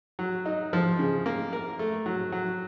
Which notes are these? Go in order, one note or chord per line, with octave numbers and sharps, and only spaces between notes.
F#3
D#4
F3
C#3
A#3
A#4
A3
F#3
F#3